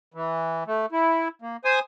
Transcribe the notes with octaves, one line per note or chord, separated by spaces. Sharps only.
E3
A3
E4
A#3
C5 G#5 D#6